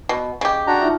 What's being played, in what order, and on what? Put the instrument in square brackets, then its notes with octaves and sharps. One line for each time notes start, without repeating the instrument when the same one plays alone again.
[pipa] B2
[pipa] C#3 G4 [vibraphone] D#5
[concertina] D4 F#4 A#5
[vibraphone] D#4 F4 E5